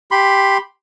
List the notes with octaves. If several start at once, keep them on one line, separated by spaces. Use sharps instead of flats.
G4 B5 C6